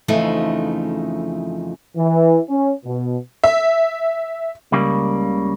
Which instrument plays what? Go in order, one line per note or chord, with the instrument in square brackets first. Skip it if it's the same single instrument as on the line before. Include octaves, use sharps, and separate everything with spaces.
[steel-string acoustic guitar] F2 C#3 E3 F3 A3 D#4
[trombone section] E3
C#4
B2
[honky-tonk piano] E5
[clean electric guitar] C#2 C#3 G3 A#3